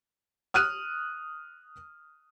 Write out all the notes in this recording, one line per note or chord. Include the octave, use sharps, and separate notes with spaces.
D#6 F6 F#6 D#7